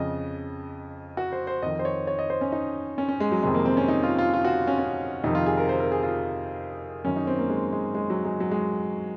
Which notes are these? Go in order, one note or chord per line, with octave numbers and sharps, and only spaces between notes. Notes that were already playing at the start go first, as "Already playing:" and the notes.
Already playing: F2 C#3 D#5
F#4
C5
C5
F2 D#3 D#5
C5
C#5
C#5
D#5
C5
C#4
D#4
C#4
C#4
G#3
F#3
F2 C3 D#3 G#3
A#3
C4
C#4
D#4
F4
F4
F4
F#4
C#4
C#4
F2 C3 D#3 D#4
F4
G#4
A#4
C5
A#4
G#4
F4
F#2 D#3 C#4
D#4
C4
A#3
G#3
G#3
G#3
F#3
G#3
F#3
G#3